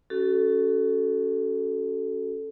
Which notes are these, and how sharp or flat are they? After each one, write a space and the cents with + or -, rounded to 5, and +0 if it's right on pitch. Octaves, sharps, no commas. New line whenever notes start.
C#4 +5 F#4 +30 A4 +0